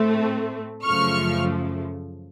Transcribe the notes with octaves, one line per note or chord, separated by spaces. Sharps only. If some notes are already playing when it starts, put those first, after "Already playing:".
Already playing: A2 A3 C4
F#2 C#3 F3 A3 C#6 F6